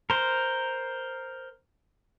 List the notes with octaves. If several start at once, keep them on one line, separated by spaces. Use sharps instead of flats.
A#4 C5